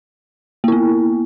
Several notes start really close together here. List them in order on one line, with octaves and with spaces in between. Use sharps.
A#3 E4 B3